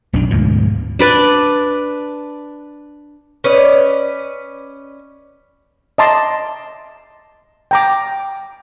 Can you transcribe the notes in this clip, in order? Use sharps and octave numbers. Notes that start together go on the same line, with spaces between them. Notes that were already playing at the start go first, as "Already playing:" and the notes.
B1 F#2 D#3 D4
D2 G#2 B2 F3
D4 B4 D5
C#4 B4 D5 D#5
D#5 E5 A5 A#5 C6 D6
G5 A#5 D6